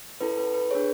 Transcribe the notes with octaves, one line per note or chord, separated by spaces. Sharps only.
C#4 E4 A4 B4
B4
B4
D4 G#4 C#5